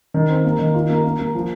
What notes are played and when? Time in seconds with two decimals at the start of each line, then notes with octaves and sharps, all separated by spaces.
0.14 D#3
0.29 C4
0.44 A#3
0.59 D#3
0.74 F4
0.90 A#3
1.04 A#3
1.19 A#3
1.35 F3